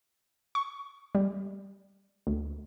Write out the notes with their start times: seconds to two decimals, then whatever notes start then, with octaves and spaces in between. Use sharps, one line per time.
0.55 C#6
1.15 G3
2.27 D2